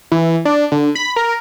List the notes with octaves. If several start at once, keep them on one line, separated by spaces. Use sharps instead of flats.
E3
D4
D3
B5
A#4